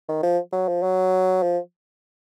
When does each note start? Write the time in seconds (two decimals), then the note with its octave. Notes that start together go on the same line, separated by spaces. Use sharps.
0.09 D#3
0.23 F3
0.53 F#3
0.68 F3
0.83 F#3
1.43 F3